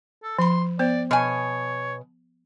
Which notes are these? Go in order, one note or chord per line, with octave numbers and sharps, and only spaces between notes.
A4
F3 B5 C6
B3 C5 D5
B2 C#5 G#5